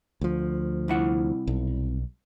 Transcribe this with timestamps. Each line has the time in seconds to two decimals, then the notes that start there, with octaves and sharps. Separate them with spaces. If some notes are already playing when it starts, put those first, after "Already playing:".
0.21 D2 F3
0.88 C2 E4 F#5
1.47 B1